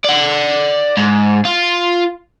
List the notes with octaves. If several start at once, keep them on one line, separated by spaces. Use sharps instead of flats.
D5 F#5
G#2
F4